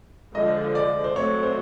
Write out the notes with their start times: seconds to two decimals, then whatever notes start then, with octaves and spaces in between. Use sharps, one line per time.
0.34 D3 F3 G#3 D#5
0.75 D5
1.04 C5
1.16 F#3 A3 C4 C#5
1.43 C5